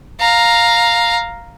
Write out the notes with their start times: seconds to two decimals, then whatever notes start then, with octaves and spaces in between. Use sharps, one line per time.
0.20 F5 A#5